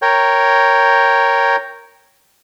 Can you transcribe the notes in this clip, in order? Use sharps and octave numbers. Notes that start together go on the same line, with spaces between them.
A#4 C#5 G5